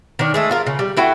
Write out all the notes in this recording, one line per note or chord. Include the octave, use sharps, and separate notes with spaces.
D#3 D4
G#3 A3 A4
F4 A#4
C#3
G3
A3 E4 F#4 G5